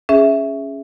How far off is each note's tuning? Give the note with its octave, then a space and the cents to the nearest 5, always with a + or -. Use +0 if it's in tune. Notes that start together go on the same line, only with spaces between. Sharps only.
C#4 +0 G#4 +0 E5 +0